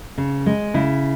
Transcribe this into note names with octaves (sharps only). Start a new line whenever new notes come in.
C#3
G#3
C#3 E4